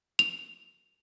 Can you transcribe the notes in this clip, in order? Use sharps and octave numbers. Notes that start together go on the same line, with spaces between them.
F7